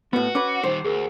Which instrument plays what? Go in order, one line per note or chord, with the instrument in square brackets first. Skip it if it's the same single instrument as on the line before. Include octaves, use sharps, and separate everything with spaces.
[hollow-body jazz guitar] A2 B3 [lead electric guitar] F#4 [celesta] B4
[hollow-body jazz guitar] C#4 B4 [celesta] D6
[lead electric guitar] D#3 G3 [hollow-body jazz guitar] C5
[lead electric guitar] D2 [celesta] G#4 A#4